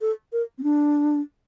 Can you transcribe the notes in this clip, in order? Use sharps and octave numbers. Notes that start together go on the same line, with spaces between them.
A4
A#4
C4
D4